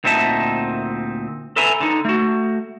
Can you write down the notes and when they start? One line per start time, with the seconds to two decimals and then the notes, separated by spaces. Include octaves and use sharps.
0.04 D2 A#2 C4 D#4 E5 A5
1.56 A4 B4 E5 G#5 A#5
1.80 D3 D#4
2.05 A3 F#4